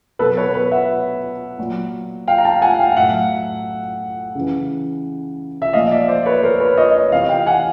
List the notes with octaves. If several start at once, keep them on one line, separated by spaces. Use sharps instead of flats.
B2 F#3 A4 B4
B4 C#5
B4 C#5
E5 F#5
A#2 F#3
F5 G5
A#5
G5 A5
F#5 G#5
F5 G5
A2 F#3 E5 F#5
C#3 E3
E5
A#2 F3 D#5 F5
D5 E5
C5 D5
B4 C#5
A#4 C5
B4 C#5
C#5 D#5
C#5 D#5
C3 E3 D#5 F5
F5 G5
F#5 G#5